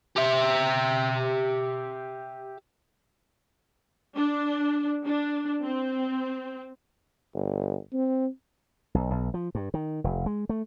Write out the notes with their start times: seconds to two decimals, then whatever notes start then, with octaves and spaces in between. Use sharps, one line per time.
0.17 G4 E5
4.15 D4
5.05 D4
5.63 C4
7.34 G1
7.93 C4
8.94 B1
9.11 B1
9.34 F3
9.55 G2
9.74 D#3
10.04 F1
10.26 G#3
10.49 A3